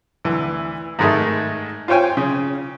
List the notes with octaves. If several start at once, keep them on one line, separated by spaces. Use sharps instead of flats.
D2 E3
G#2 D#3 G#3 A3 D#4
F4 C5 C#5 G5 G#5
C#3